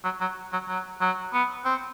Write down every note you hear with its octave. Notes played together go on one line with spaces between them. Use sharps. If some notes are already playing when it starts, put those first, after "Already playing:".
F#3
F#3
F#3
F#3
F#3
B3
C4